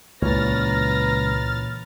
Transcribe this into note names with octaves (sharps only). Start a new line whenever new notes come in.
C#2 A#2 E3 B4 C#5 A#5 F6 A6